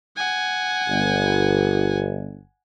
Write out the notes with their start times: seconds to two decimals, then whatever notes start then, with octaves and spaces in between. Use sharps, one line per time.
0.16 F#5 G#5
0.89 G1